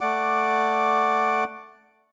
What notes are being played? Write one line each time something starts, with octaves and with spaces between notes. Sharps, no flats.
A3 D5 F#5 D6